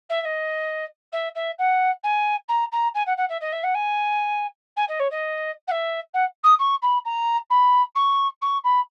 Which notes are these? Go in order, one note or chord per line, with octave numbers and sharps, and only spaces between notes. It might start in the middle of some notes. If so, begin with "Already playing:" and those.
E5
E5
D#5
E5
E5
F#5
G#5
A#5
A#5
G#5
F#5
F#5
E5
D#5
E5
F#5
G#5
G#5
D#5
C#5
D#5
F#5
E5
F#5
D#6
C#6
B5
A#5
B5
C#6
C#6
B5